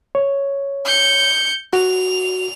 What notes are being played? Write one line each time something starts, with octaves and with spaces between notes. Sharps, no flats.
C#5
G6 C#7
F#4 F7